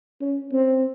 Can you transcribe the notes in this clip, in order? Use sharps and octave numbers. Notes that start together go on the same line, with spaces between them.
C#4
C4